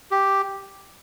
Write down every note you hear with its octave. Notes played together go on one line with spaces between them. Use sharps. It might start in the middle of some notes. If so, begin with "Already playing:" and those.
G4